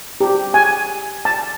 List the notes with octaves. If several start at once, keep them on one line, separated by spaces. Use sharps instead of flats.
G4
G#5
A5